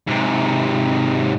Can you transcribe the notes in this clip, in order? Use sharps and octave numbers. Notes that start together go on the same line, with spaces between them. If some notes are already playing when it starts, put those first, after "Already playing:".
G#2 C3